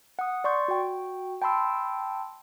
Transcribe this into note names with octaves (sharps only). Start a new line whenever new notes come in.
F#5 D#6
D5 C6 C#6 G6
F#4 G5
G5 A5 B5 C6 E6